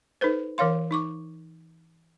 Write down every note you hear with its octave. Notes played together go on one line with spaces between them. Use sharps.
D#4 A4 B4 C5
E3 A#4 C#5 F5 C6
D#4 C#6 D6